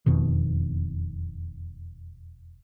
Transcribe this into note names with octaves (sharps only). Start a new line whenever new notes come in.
E1 F2 B2 D#3